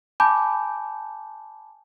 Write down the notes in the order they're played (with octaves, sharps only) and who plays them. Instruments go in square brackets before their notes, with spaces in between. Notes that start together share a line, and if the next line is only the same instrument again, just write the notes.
[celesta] G#5 A5 B5 D6 G6